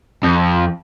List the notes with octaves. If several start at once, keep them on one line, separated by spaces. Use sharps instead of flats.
F2